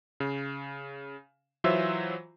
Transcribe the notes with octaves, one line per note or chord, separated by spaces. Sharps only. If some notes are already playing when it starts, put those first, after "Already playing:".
C#3
E3 F#3 F4 C5 E5 E6